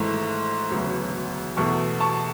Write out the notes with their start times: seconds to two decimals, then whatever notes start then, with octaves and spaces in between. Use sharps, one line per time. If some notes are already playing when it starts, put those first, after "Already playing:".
Already playing: G#1 G#2 E3 A3
0.71 E1 D2 C#3 F#3 B3
1.57 E2 B2 A3 A5 C#6
2.00 A5 C#6